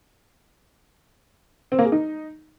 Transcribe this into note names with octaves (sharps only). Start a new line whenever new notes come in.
C4
A#3
G#4
D#4